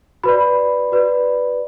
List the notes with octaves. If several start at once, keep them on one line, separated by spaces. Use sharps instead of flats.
F#4 B4 D5 B5
F#4 B4 D5